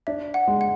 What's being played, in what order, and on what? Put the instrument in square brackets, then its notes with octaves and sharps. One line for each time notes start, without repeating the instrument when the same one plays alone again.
[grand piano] D4 [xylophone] E5
[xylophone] F#5
[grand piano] G#3
[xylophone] F#5